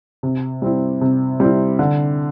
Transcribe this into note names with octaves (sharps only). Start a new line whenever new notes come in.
C3
G3 C4 E4
C3
G3 C4 E4
D3